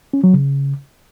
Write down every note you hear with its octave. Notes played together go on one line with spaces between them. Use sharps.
C#4
F#3
C#3